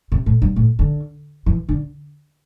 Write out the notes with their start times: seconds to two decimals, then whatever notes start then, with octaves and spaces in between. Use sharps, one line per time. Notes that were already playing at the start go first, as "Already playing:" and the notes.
0.12 C3
0.26 A2
0.42 G2
0.56 A2
0.79 D3
1.46 E3
1.69 D3